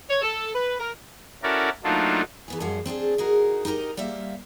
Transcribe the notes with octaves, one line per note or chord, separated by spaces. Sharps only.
C#5
A4
B4
A#4
C#4 E4 F#4 A4 A#4 D5
F#3 A3 A#3 D4 D#4 F4
E3 B3 G#4
F#2 A2 F3 G3 G#4 F#5
C4 D4 F4 G#4
D#4 F#4 G#4 A#4
D#4 G4 G#4 A#4 D#5
G3 A#3 C5 E5 F5